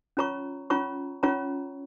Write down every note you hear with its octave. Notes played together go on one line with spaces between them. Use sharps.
C#4 F4 C#5 A#5 C#6
C#4 F4 C#5 A#5 C#6
C#4 F4 C#5 A#5 C#6